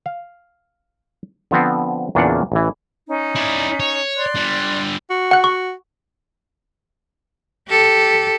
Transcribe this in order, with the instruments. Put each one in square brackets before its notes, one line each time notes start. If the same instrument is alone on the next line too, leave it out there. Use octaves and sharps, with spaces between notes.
[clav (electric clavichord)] F5
D3 F3 B3 C4
E2 A#2 C#3 D4 F5 F#5
A1 E3
[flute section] C#4 D#4
[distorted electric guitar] E4 D5
C#5
[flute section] D5 C6 F#6
[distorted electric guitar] D3 G3
[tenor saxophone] F#4
[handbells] F#5 F#6
C#6
[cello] G4 A4